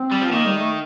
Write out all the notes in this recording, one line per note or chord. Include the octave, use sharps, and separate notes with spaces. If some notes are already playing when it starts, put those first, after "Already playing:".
Already playing: C4
G3
F3
D#3 A#3
G3
A3